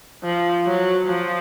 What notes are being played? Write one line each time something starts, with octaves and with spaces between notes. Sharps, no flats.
F3
F#3
F3